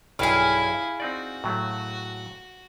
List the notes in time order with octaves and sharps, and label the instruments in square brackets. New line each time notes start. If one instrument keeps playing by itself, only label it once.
[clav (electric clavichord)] B1 G2 [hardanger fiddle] E4 G#5 [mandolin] G#4 F5
[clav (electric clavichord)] C4 D#4 D5 [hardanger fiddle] F#4
[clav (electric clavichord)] A2 F#3 A3